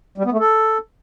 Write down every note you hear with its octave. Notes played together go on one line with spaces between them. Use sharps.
G3
B3
A3
A4